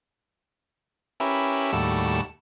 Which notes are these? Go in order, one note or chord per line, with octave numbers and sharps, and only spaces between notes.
C#4 E4 G4 A#4 B4 E5
D#2 A2 G3 F#4 A4 E6